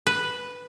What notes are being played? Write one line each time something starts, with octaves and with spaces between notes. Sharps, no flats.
B4